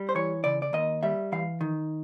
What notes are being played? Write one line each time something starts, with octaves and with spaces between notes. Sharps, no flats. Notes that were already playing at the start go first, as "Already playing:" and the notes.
Already playing: G3
C5
E3 C#5
C#3 D5
D5
D#2 D#5
G3 E5
E3 F5
D#3